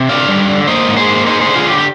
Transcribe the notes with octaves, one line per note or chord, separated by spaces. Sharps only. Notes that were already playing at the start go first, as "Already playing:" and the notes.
Already playing: C3
D3 D5 F5
G3
D3
A#3 C5 D#5
G#2
G#4 C5
A#3
D#4 G#4 C5
D3 G#4 C5
F4 G#4
D3 G4
G4